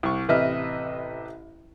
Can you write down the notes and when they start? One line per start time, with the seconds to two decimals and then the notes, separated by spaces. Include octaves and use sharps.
0.03 C2 C#6
0.28 A1 C3 B4 D#5 E5 F6